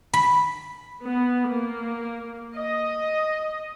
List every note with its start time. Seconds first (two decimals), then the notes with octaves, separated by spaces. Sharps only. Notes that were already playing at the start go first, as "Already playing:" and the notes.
0.14 B5
1.02 B3
1.48 A#3
2.55 D#5